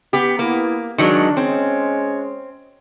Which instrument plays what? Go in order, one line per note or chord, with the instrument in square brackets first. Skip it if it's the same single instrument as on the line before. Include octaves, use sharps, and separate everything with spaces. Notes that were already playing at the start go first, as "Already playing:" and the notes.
[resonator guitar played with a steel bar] B3 G4
[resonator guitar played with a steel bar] A#3 [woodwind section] B3 E4
[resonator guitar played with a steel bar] D#3 F#3 G#3 [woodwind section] D4
[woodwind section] G#3 C#4 C#5 [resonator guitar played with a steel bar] C4